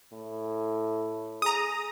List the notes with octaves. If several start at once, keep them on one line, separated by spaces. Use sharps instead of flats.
A2
G#4 A#5 D#6